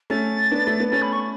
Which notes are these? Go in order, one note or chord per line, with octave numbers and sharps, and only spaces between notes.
A3 C#4 A6
B3 D4
A3
B3
A3 C#4 A6
B5
C#6